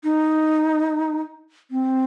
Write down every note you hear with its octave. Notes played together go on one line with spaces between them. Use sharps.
D#4
C4